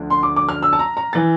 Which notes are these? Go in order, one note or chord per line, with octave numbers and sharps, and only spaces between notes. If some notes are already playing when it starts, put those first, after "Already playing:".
Already playing: D2 D3 F3
C6
D6
D6
F6
E6
A5
A#5
A#5
E3 A6